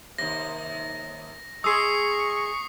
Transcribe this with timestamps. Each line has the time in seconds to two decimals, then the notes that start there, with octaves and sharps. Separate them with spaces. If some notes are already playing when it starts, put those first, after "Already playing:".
0.18 D#2 C3 A#6
1.64 G#3 G#4 C6 C#6 D#6 E6 C7